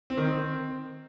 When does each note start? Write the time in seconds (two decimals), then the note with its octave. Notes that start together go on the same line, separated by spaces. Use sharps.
0.10 C4
0.17 D#3
0.25 C4